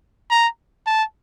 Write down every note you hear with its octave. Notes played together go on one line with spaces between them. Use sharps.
A#5
A5